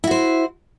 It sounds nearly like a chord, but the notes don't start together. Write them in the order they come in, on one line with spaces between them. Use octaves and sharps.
E4 F#4 C5